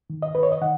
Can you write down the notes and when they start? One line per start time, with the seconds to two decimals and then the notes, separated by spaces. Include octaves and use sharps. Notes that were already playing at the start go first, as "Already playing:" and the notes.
0.10 D#3
0.22 D#5
0.35 D#3 B4
0.43 C#5
0.52 D#5
0.61 D#3 F#5